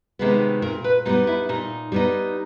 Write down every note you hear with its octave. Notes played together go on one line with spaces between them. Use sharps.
C3 D#3 G#3 B3
A#2 A#4
B4
G3 B3 D#4 F4
E4
A#2 D#4
G3 B3 D#4